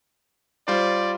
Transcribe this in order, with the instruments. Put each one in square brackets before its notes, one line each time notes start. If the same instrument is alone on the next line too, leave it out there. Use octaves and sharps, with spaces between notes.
[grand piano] G3 F4 C5 [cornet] D5